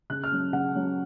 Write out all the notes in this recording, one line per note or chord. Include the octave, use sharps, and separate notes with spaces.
C#3 F#6
F6
F#3 C#4
C#3 F#5
F#3 C#4